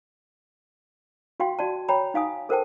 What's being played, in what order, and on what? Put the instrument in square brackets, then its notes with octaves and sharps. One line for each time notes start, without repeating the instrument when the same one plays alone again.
[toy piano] F#4 F5 G5 C6
F#4 D5 A5
C#5 G5 A#5 B5
D#4 F5 G#5 D#6
A4 A#4 C5 F#5 G5 A5